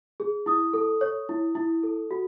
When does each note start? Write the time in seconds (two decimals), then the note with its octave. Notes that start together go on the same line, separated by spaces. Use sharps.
0.20 G#4
0.46 E4 D#6
0.74 A4
1.01 C#5
1.29 E4
1.55 E4
1.83 A4
2.11 F#4